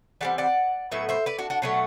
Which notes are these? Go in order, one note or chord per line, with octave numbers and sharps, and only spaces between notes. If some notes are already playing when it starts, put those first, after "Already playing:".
E3 G3 C4 D5 F#5
D5 F#5
A2 F#3 B3 E5
C5 E5
B4 D5
D4 F#4
D4 F#4
B2 F#3 A3 D4 F#4